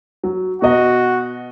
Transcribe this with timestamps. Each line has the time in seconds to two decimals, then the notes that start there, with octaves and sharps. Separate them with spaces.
0.24 F#3
0.62 B2 F#4 D#5